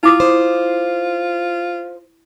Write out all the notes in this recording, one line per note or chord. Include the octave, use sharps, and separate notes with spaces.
E4 F4 D6 D#6
C5